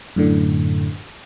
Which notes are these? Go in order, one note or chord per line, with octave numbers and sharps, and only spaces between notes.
F#2 A2 D3